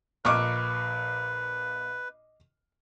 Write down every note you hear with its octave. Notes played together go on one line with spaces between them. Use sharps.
A#1 A#2 B4 D#5 C#6 D6 F6